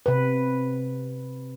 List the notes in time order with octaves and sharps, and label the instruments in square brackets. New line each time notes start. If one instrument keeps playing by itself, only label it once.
[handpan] C3 B4